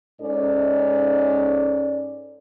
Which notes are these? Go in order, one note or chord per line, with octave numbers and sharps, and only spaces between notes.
G#2 C#4 D#4 A4 D5